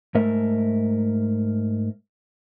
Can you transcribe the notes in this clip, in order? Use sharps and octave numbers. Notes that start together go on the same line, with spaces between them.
G#2 A3 A#4 E5